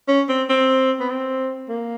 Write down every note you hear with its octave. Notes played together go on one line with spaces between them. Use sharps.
C#4
C4
C4
B3
C4
A#3